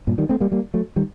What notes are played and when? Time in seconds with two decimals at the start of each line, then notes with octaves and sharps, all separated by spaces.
0.07 G2 A#2
0.18 D#3 G3
0.29 A3 C4
0.40 G3 A#3
0.52 G3 A#3
0.74 F#3 A3
0.96 D#3 G3